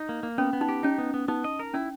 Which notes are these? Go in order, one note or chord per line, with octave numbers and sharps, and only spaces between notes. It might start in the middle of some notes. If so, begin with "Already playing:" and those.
Already playing: D#4
A#3
A#3
B3 C#4
B3
D#4
G4
C#4 D#4
B3
B3
B3 D#4
D#5
A#4
C#4 E4